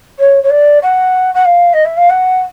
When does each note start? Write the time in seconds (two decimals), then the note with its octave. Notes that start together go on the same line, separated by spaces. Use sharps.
0.19 C#5
0.43 C#5
0.50 D5
0.82 F#5
1.34 F#5
1.45 F5
1.73 D#5
1.85 E5
1.97 F5
2.09 F#5